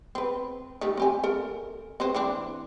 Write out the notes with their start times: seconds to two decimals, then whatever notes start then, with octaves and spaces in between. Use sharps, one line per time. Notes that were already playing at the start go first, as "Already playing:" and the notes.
0.15 C4 B4
0.81 D#3 G3 A3
0.97 C4 G4 G#5
1.24 A4 A#4
2.00 C4 B4 C5
2.14 E3 C4 D4